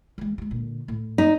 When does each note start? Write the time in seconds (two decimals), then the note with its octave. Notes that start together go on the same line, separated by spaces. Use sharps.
0.18 E3 G#3
0.38 F#3 G#3
0.51 A#2 D3
0.88 A2
1.18 D#4